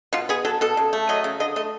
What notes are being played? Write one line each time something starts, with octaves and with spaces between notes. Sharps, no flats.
B2 F4
B3 G#4
F#3 A4
B2 A4
C#3
A3
F#3 D#5
C#3
D3 D#5
A3 D#5